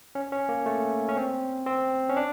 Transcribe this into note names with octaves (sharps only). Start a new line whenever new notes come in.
C#4
C#4
A#3
A3
C#4
C4
C4
C#4
D4